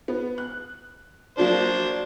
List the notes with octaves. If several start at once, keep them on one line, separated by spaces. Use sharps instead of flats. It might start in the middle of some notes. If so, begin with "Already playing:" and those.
B3
F#6
F3 F#3 A#3 D4 C5